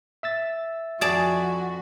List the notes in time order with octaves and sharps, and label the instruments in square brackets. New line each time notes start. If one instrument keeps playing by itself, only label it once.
[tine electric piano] E5 E6 A6
[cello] F2 F#4 [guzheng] G#4 D5 A5